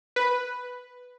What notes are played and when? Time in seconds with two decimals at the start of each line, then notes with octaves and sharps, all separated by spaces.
0.16 B4